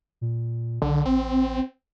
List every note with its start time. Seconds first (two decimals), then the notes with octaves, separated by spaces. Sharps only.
0.21 A#2
0.82 B1 D3
1.05 A1 C4